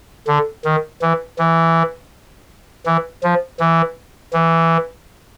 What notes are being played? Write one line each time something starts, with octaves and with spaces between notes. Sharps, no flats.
D3
D#3
E3
E3
E3
F3
E3
E3